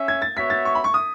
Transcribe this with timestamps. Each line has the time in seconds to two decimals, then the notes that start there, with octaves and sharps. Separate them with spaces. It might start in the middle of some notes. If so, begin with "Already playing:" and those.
Already playing: C#4 E5
0.08 G#6
0.22 A6
0.36 B3 F#4 C#5 E5 B6
0.50 A6
0.65 C#6
0.75 B5
0.84 C#6
0.94 D#6